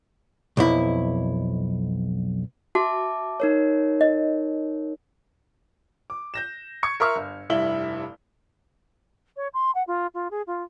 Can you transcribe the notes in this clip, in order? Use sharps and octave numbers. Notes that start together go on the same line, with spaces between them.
B1 F2 E4
F#4 E5 A5 D6
D#4 A#4 C#5
D#5
D6
G6 A#6 E7
C#6 G#6 C#7
A#4 E5 C6 C#6 E6 F6
G1
F1 G2 E4 E5 F#7 G7
C#5
C6
F#5
F4
F4
G#4
F4